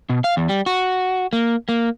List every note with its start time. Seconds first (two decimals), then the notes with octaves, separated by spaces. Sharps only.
0.09 B2
0.24 F5
0.37 E2
0.49 G3
0.66 F#4
1.33 A#3
1.69 A#3